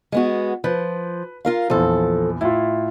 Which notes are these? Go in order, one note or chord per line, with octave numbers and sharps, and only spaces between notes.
G#3 B3 F#4
F3 B4
F4 A#4 F5
A#1 E2 F3 A4
A2 E4 F4